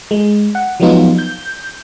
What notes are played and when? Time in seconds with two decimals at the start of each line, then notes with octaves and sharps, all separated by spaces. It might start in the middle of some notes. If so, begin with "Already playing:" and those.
0.11 G#3
0.55 F#5
0.80 F3 F#3 G#3 B3 D#4 F4
1.19 G6